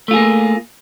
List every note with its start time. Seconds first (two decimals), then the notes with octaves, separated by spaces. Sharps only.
0.08 A3
0.11 F4
0.14 G#4
0.16 A#3